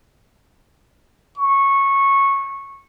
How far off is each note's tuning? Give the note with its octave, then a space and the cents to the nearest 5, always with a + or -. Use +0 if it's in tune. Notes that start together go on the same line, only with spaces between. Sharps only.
C#6 -15